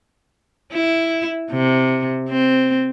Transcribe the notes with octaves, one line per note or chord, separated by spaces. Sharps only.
E4
C3
C4